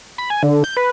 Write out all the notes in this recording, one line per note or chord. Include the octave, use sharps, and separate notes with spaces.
B5
G#5
D3
G6
B4